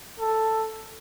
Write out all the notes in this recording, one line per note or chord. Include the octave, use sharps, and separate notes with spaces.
A4